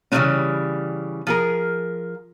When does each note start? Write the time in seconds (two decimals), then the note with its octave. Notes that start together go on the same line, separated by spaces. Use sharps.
0.12 C#3 E3 F3 G3 G#3 C#4
1.27 F3 G#4 A#4